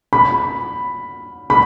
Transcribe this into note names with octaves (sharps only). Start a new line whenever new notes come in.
B5
B5